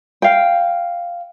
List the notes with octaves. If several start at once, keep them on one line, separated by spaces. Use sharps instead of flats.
F5 G5